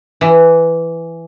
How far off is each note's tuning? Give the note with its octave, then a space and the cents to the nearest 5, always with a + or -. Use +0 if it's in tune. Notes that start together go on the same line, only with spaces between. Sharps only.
E3 +10